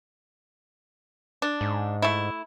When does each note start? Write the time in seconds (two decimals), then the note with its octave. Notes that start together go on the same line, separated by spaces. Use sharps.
1.42 D4
1.61 G#2
2.02 A3 E4